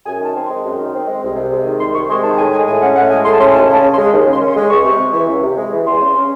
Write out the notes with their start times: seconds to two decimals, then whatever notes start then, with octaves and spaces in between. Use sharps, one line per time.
0.05 F#2 G#5
0.20 D#3 A5
0.35 C4
0.45 G#3 C6
0.64 F#2
0.78 D#3
0.93 C4
1.07 G#3
1.22 C2
1.36 C3
1.51 G#3
1.65 D#3
1.80 C2 C6
1.94 C3 C#6
2.09 G#3 C6
2.23 D#3 A5
2.38 A2 G#5
2.52 G#3 G#5
2.67 A2 G#5
2.81 C#4 F#5
2.96 A2 F#5
3.10 G#3 G#5
3.25 A2 C6
3.33 A5
3.39 C#4 C6
3.54 D#2 A5
3.69 C#3 A5
3.83 C#4
3.93 C6
3.97 G#3
4.12 D#2
4.26 C#3
4.32 C6
4.41 C#4
4.51 C6
4.56 G#3
4.70 C#2 C#6
4.84 C3
4.99 G#3
5.13 E3
5.28 C#2
5.43 C3
5.57 G#3
5.72 E3
5.86 E2 C6
6.00 C#3
6.15 C#4